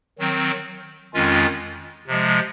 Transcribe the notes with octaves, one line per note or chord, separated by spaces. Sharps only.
D#3 F#3 C4
F2 D#3 G#3 C#4 F4
C3 F3 G#3